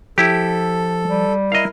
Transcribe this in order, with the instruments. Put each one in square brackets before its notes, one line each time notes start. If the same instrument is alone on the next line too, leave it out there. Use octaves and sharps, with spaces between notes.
[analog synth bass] F3 [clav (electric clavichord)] E4 G4 [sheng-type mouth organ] A4
[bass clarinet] G3
[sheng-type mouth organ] E4 A#4 [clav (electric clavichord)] D#5 F5